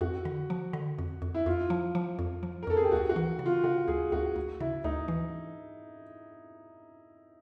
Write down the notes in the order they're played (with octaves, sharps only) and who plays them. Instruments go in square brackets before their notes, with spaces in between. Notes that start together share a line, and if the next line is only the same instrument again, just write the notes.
[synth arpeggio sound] F2 [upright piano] F#4
[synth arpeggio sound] D3
F3
D3
F2
F2
[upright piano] E4
[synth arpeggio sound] F2 [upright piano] F4
[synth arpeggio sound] F3
F3
F2
F3
[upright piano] A#4
[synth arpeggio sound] F2 [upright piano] A4
[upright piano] G#4
G4
[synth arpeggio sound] D2 [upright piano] F#4
[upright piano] F#4
[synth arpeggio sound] E3
C#3
[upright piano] F4
[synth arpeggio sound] C#3 [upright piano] F#4
[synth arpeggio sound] D2 [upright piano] G#4
[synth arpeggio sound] D2 [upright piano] F#4
[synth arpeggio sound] D2
[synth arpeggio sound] C#3 [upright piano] E4
[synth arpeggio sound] D2 [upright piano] D#4
[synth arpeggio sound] E3